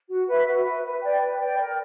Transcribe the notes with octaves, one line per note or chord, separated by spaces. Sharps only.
F#4
B4 E5
F#4
B4 E5
B4
D5 G5
B4
D5 G5
A#4